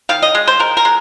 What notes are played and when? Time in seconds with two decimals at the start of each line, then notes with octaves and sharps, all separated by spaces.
0.09 D#3 F5
0.22 D#5
0.35 G#3
0.48 C5
0.59 D#3 A#4
0.77 A#4
0.85 G#3